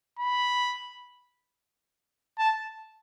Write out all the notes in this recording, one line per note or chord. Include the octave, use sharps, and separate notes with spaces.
B5
A5